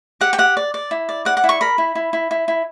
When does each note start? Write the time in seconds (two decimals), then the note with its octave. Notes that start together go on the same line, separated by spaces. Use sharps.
0.21 G4 F#5
0.33 G5
0.38 G4 F#5
0.57 D5
0.74 D5
0.91 E4
1.09 D5
1.25 D5 F#5
1.37 F#5
1.44 E4
1.49 C#6
1.61 A#4 B5
1.78 E4
1.95 E4
2.13 E4
2.31 E4
2.48 E4